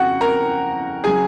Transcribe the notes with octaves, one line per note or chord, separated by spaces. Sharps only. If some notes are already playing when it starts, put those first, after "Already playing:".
Already playing: F2 C#3 F#4 F#5
A#4 A#5
C#3 F#3 G#4 G#5